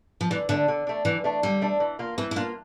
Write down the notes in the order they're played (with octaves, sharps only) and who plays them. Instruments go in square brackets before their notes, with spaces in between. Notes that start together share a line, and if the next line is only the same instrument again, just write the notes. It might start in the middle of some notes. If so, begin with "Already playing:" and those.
[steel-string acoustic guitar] F3
[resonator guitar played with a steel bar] D3 [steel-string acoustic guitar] E3
[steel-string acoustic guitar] D3 [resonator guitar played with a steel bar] A3 D4
[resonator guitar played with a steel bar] D3
A3 D4
[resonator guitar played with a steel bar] D3 [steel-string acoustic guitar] E3
[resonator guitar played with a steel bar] A3 D4
[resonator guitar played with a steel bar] D3 [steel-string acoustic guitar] G3
[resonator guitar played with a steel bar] A3 D4
E3
A#3 F4
[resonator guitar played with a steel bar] E3 [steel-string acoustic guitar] C4
[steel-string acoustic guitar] E4
[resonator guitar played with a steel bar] A#3 F4 [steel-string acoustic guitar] D4